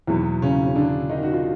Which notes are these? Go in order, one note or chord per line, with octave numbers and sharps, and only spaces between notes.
E2 B2 F#3
C#3 C#4
C#4
D3 D4
D#3 D#4
F#4
F4